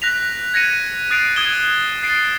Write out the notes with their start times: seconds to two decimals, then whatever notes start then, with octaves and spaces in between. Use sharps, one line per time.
0.02 F#6 A#6 B6 F7
0.54 G#6 A#6 C#7 D#7
1.11 D#6 F#6 A6 C7 D7 F7
1.36 D#6 G#6 D#7 E7 G7
2.03 A6 C7 D7 E7